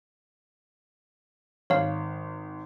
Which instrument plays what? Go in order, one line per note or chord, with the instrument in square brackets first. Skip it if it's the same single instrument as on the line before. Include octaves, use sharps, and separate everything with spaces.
[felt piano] G#1 [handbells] C#5 F5